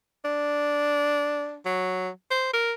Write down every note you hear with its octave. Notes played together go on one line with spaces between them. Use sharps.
D4
F#3
C5
A#4